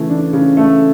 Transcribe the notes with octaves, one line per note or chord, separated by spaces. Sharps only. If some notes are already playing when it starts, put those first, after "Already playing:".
Already playing: C#3 E3 A3
D4
C#3
A3